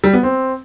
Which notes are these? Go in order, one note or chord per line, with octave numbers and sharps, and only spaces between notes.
G3
B3
C4